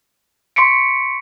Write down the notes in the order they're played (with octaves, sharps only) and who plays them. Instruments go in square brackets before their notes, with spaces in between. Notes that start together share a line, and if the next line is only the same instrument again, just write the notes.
[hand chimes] C6 C#6 B6 C#7 D7